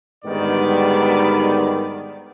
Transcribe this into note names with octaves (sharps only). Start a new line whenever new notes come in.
G#2 D3 D#3 G3 B3 D5